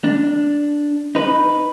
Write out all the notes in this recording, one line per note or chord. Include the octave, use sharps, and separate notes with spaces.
D4
D#4 B4